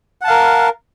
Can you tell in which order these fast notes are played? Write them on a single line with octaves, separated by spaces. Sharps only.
F#5 A5 F5 A#4